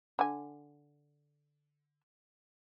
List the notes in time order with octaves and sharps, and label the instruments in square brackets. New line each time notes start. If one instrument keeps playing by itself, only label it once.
[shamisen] D3 G#5